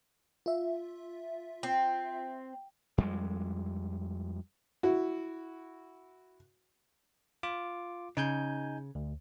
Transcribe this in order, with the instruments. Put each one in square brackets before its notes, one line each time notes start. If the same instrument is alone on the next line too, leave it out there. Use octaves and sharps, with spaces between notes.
[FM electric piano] F4 E5
[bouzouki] C4
[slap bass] F2 G3 G#3
[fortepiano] E4 F#4
[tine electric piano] F4 D6
[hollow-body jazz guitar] C#3 [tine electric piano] D#4 G#5 G6
[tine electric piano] D2